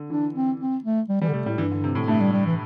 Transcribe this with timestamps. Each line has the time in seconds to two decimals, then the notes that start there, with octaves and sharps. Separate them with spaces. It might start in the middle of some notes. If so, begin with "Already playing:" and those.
Already playing: D3
0.10 E3 D4
0.34 C4
0.60 C4
0.84 A3
1.09 G3
1.21 E3 G3
1.29 D3
1.33 C3 A3
1.46 A2 G3
1.58 G2 E3
1.71 D3
1.84 C3
1.95 A2
2.08 G2 A3
2.20 G3
2.33 G3
2.46 E3